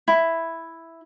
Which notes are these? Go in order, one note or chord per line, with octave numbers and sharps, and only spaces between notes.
E4